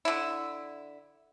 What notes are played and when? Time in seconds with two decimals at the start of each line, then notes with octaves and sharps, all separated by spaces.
0.05 D3 E4